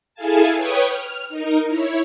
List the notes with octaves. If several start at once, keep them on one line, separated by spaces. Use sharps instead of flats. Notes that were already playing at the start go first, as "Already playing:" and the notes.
E4 G#4 A4 F5 G#5 A5
B4 C#5 G5 C#6 D#6
F6
D#4 A#4
E4 C#5